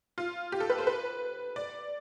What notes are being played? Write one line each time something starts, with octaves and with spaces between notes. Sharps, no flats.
F4
G4
A4
B4
C5
B4
D5